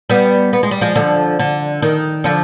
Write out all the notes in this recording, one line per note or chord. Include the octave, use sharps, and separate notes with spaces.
G3 B3
B3
G#3
G3
F3 G#3
D3 F3
D3
D#3
D3 F3